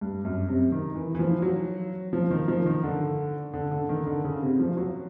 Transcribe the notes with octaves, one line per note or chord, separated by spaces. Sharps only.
G2
F#2
C3
D#3
E3
E3
F3
F#3
F3
D#3
F3
D#3
D3
D3
D3
D#3
D3
C#3
C3
F3
F#3